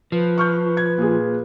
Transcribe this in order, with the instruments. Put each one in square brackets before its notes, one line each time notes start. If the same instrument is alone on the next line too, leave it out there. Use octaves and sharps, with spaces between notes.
[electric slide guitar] F3 [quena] B4
[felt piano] C#6 F6 G6
G#6
A#2 G#4